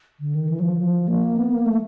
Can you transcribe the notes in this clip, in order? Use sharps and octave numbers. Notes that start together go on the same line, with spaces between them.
D3
D#3
E3
F#3
F3
F3
A#3
B3
A#3
A3